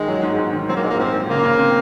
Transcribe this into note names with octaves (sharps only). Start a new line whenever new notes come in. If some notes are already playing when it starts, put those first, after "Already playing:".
Already playing: D#3 G#3
F#3
G#2
G#2
D#3
F#3 C4
A#3
A#1 G#3
A#3
G#2 C4
A#1
C#3 A#3
C#3
C4